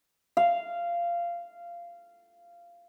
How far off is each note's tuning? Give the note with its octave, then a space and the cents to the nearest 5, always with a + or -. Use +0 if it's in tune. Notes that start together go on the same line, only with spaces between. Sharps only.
F5 -15